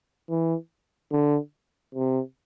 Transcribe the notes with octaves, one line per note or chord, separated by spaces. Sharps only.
E3
D3
C3